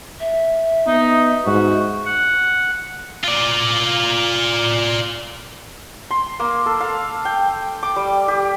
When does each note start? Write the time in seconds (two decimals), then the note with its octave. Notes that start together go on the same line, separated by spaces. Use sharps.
0.20 E5
0.87 B3 D#4
1.46 G#2 F#4
2.06 F#5
3.24 F4 D5
6.11 C6
6.39 A#3
6.66 A4
6.80 F5
7.25 G5
7.83 D6
7.96 G3
8.28 G4